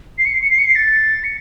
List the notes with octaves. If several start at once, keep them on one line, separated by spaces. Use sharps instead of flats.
C7
C#7
C7
C#7
C7
C#7
C7
A6
C#7